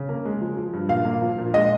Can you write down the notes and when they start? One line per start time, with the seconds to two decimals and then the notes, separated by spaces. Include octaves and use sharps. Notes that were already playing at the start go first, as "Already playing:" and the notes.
Already playing: C#3
0.09 A#3
0.25 G#3
0.41 F3
0.57 F3
0.73 G2
0.89 A#2 F5
1.05 A#3
1.22 F3
1.38 A#2
1.54 G#3 D#5